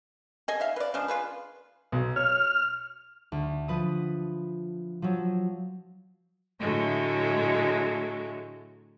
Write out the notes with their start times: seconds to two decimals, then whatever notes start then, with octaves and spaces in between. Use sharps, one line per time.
0.48 G#4 D#5 G#5
0.60 D#4 E5 F5
0.76 B4 D5
0.94 C#3 F3 G#3 D4
1.08 F4 G#4 B4
1.92 B1
2.16 C#5 F6
3.32 D2
3.68 F3 B4 D#6
5.02 F3 F#3
6.60 A2 D3 F#3 G#3 A3